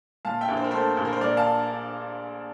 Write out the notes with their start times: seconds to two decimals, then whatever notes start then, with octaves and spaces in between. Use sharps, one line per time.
0.25 A#2 F5 A5
0.41 E5 G5
0.49 A#1
0.57 C5
0.64 A#4
0.71 A3 A4 C5
0.97 A#1
1.05 A#4
1.12 C5
1.21 A#2 A#4 D5
1.37 F5 A5